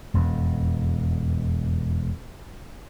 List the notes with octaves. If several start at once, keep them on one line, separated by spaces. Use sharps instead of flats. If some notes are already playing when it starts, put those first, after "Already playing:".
E1 F2